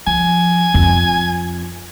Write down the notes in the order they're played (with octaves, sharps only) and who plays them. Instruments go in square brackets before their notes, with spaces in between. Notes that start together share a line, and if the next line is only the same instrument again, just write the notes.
[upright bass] F3 [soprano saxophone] G#5
[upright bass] F2